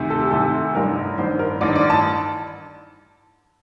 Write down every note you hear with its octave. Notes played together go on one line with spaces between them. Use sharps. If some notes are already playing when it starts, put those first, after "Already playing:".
Already playing: D2 C3 D#3
A4
G4
D2 C3 D#3 A4
A1 G2 D#3 A#4
A1 G2 D#3 C5
A#4
A1 G2 D#3 D5
D5
A5